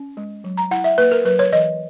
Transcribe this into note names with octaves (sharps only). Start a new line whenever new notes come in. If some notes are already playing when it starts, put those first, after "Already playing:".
Already playing: C#4
G#3
F#3
A#5
E4 F#5
E5
A#3 B4
A#4
F#3 B4
C#5
E3 D#5